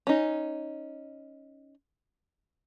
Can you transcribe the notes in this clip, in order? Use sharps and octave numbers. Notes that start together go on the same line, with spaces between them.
C#4 D#4